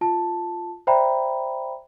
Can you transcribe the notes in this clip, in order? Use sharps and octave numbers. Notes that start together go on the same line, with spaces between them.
F4 A5
C5 D5 E5 G5 A#5 B5